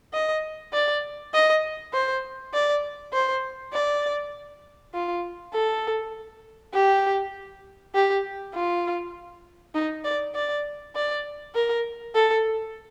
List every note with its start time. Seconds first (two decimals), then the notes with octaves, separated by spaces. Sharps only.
0.14 D#5
0.73 D5
1.34 D#5
1.93 C5
2.53 D5
3.13 C5
3.73 D5
4.94 F4
5.53 A4
6.74 G4
7.95 G4
8.54 F4
9.75 D#4
10.04 D5
10.35 D5
10.96 D5
11.55 A#4
12.15 A4